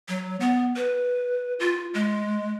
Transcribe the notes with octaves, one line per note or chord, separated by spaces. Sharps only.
F#3
B3
B4
F4
G#3